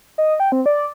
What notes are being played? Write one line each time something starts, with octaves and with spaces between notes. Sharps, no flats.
D#5
G5
C4
D5